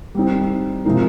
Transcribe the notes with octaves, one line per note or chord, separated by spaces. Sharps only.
G3 C4 D#4
C3 F3 G#3 D#4 A#4